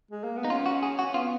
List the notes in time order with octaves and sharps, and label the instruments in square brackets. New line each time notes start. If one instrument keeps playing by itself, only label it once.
[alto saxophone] G#3
A#3
B3
[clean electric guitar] D#4
[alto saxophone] C#4 [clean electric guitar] F4
[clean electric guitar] F#4
G#4
F#4
[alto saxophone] C#4
[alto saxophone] B3 [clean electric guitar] F4